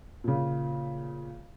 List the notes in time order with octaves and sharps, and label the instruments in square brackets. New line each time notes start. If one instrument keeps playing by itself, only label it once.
[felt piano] A#2 C#3